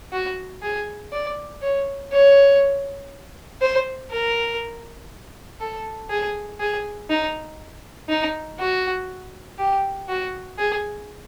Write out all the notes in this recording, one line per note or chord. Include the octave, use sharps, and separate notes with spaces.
F#4
G#4
D5
C#5
C#5
C5
A#4
A4
G#4
G#4
D#4
D#4
F#4
G4
F#4
G#4